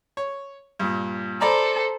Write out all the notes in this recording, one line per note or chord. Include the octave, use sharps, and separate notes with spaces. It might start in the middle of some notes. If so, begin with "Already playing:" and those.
C#5
G2 A#2
A4 C5 D5 A#5 B5